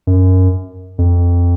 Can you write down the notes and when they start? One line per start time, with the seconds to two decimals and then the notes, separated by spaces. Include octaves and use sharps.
0.07 F#2
0.98 F2